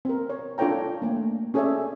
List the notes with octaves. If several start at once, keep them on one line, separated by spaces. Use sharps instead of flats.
C4 A#4
C#5
D4 F4 A4 C#5 G5 A#5
A3 A#3
C#4 G#4 A4 C#5 D5 E5